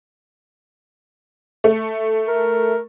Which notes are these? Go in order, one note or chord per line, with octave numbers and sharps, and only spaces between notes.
A3
A#4